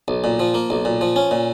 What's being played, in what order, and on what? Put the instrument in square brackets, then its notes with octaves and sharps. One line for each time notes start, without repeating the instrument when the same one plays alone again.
[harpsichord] B1
A#2
F3
A#3
B1
A#2
F3
C#4
A#2